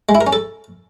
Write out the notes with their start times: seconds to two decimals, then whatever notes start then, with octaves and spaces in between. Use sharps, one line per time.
0.09 G#3
0.15 E4
0.21 A#4
0.27 C#4
0.33 A4